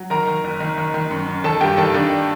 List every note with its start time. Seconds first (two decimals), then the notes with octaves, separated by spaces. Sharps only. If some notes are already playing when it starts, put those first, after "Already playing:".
Already playing: F#3
0.10 D#3 A#4 A#5
0.27 D#3
0.44 F#1
0.60 D#3
0.78 D#3
0.94 D#3
1.11 F#2
1.28 F#2
1.44 D#3 A4 A5
1.61 G2 G4 G5
1.77 D#3 A4 A5
1.94 D#3 D4 D5